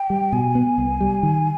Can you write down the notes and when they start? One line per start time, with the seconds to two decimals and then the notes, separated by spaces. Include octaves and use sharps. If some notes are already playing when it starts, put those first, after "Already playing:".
Already playing: G5
0.10 G3
0.32 B2 G#5
0.55 B3
0.78 C2
1.01 G3
1.23 D#3